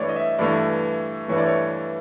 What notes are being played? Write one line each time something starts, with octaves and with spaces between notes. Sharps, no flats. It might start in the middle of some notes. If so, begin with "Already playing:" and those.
Already playing: G2 E3 A3 C#5 D5
D#5
E5
G2 E3 A3 D5
G2 E3 A3 C#5
D5
C#5